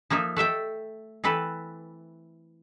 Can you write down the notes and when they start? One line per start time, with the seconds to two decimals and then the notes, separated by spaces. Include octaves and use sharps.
0.10 F3 A#3 D#4 E5
0.36 A3 A4 E5 G5
1.24 E3 C4 A4 B4